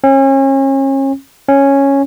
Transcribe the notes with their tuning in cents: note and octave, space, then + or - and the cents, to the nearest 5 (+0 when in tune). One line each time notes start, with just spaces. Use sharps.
C#4 -35
C#4 -5